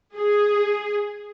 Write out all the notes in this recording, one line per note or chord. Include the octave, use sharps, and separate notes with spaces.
G#4